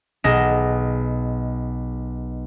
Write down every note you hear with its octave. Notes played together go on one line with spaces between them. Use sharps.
B1 G#4 D#5 A#6 E7